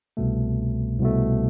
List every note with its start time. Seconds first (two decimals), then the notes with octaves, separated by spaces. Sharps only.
0.17 C2 B2 A3
1.00 C2 B2 A3